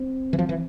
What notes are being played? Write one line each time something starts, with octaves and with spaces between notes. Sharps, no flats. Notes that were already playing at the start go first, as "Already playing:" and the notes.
Already playing: C4
E3
F3
E3